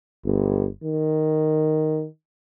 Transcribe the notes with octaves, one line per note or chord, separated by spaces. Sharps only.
G1
D#3